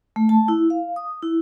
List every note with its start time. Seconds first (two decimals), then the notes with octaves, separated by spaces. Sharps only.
0.16 A3
0.29 A5
0.48 E4
0.70 F5
0.96 D#6
1.22 E4